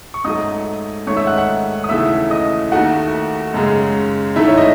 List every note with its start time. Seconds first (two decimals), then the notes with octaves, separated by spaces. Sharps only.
0.14 C#6
0.24 G#2 F#3 A3 D#5 D#6
1.07 G#2 D#3 A3 C#5 C#6
1.16 E5 E6
1.27 F#5 F#6
1.37 F#5 F#6
1.84 D#6
1.89 D#2 C#3 E3 A3 E5 E6
2.31 D#5 D#6
2.72 D#2 D#3 A3 F#4 F#5
3.54 F#2 C#3 G#3
4.36 G#2 D#3 A3 E4 E5
4.47 C#5
4.57 D#5